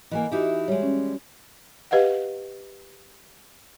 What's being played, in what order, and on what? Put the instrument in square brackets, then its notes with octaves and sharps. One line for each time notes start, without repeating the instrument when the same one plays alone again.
[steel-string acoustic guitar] E3 G3 A#3 [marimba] D#5 G#5
[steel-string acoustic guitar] E3 D#4 E4 [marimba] F#4 G4 D6
[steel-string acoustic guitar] G3 G#3 [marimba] C#5
[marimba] C#4
[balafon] G4 B4 D#5 F5 F#5